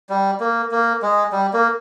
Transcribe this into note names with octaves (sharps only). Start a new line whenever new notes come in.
G3
A#3
A#3
G#3
G3
A#3